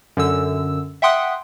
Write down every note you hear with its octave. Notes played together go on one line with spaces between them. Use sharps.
F#2 D3 E6
E5 F#5 G5 C6 D#6 F#6